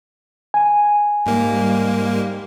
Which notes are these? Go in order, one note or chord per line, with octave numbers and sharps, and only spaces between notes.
G#5
G#2 G3 A#3